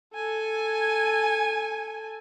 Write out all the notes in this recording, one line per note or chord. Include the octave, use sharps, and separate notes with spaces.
A4 G#5